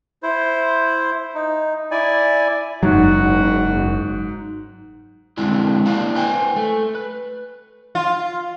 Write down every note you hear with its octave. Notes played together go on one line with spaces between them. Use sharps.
E4 C5
D#4
E4 D5 G#5
F#1 G#2 F#3 F#4
D3 G#3 C4 D4 E4
A#3 D4 E4 D5 F5
B4 C5 G5 G#5
A3
B4
F4